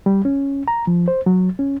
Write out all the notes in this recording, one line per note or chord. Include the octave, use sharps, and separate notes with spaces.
G3
C#4
A#5
F3
C5
F#3
C#4